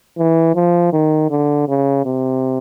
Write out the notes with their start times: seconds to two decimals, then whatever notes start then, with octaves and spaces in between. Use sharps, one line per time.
0.18 E3
0.55 F3
0.93 D#3
1.31 D3
1.68 C#3
2.06 C3